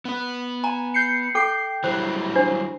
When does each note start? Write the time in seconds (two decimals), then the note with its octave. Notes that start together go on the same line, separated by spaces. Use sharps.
0.05 B3 B4
0.64 G#5 A#5
0.94 G6 C7 C#7
1.35 A4 G5 D6 G6 C7
1.84 E3 F#3 G3 C5
2.36 D4 C5